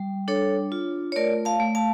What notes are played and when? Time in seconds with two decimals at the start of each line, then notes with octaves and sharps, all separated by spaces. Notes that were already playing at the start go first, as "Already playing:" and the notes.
Already playing: G3
0.28 D4 A4 C#5
0.72 F4
1.12 C#5
1.16 A3 A#4 D5
1.45 F5 A5
1.60 A3
1.75 F5 A5